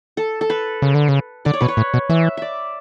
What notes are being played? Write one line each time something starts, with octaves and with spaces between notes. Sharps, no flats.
A4
A4
B4
C#3
D3
C#3
D3 D5
C#5
B2 B4
C#5
A2
B2
E3 E5
D5 E5